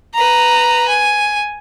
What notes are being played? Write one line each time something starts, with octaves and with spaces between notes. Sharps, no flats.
B4 A#5
G#5